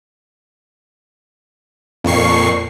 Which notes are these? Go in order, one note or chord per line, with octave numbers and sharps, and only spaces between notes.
F2 A#2 C#6 C7